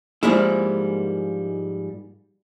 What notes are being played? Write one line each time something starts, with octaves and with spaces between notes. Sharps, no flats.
G#2 F3 G3 G#3 A#3 E4